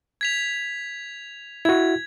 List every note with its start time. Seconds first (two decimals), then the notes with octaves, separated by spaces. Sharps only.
0.21 G#6 B6 F7
1.65 E4 F#4 G#6